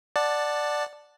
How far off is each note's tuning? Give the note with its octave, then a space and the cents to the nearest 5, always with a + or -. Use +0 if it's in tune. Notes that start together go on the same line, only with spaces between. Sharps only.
D5 +10 F#5 -5 A5 +0